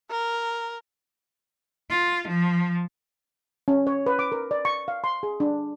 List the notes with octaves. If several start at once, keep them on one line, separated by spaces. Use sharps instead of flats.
A#4
F4
F3
C#4
C#5
B4
D6
A#4
D5
C#6
F5
C6
G#4
D4